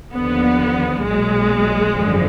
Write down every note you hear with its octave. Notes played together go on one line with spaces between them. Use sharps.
D#2 D3 F3 B3
B1 A#2 F#3 G#3
G#1 F#2 D3 F3